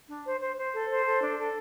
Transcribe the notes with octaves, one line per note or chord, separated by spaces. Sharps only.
D4
C5
C5
C5
A4
C5
A4
D4
A4